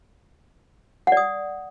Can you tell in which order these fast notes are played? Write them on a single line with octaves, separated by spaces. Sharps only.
F#5 D5 D#6